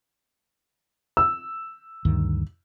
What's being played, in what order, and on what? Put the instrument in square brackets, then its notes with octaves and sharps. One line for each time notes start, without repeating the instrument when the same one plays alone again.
[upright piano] E6
[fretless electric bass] D2 G2 D#3